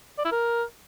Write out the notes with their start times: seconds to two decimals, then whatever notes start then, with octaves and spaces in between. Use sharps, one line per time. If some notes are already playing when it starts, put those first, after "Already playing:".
0.18 D5
0.25 E4
0.32 A#4